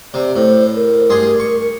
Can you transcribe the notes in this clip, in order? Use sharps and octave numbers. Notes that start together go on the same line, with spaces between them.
C3 D5
A2 C5
A#4
G2 G#4 C6
C#6